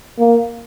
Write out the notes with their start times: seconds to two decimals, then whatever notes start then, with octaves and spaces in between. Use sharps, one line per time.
0.19 A#3